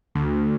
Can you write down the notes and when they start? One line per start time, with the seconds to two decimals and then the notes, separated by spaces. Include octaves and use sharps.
0.15 D2